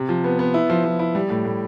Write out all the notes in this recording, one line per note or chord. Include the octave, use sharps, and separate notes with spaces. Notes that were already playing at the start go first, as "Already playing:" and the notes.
Already playing: C3
F3
B3
B3
E4
F3
F3
E4
G3
A2
A2